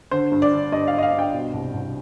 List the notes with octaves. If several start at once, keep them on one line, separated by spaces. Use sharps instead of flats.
D3 C5
G2
D5
D3
G2 D#5
F5
G2
D#5
F5
G2
G5
B2
C2
C2